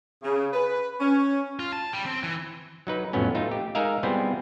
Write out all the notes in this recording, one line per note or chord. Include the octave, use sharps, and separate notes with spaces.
C#3
B4
C#4
F4
A5
G3
C4
E3
F#3 D#4 B4
F2 A2 F#3 B3 C#4
A3 D#4 F4
G4
G#3 D#4 G#4 A#4 E5 F5
G3 B3 C4 E4 F4 G#4